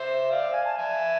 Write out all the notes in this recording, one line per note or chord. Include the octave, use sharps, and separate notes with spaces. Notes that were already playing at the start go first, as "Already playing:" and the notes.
Already playing: C5 E5
D5 F5
G#5
A5
E5 G#5